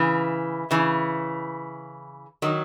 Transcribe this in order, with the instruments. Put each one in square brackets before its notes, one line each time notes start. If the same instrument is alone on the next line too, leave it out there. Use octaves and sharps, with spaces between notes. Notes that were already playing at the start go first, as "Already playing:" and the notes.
Already playing: [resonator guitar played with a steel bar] C#3 E3
C#3 E3
D#3 F#3